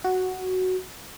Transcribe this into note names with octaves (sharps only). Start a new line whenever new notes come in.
F#4